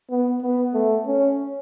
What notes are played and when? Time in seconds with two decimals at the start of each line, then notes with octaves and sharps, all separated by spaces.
0.10 B3
0.41 B3
0.74 A3
1.06 C#4